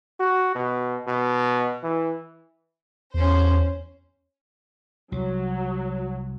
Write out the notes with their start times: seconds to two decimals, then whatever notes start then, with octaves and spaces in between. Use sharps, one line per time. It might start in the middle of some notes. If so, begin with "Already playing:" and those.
0.20 F#4
0.55 B2
1.07 B2
1.83 E3
3.14 E2 C#4 C5
5.12 C2 F#3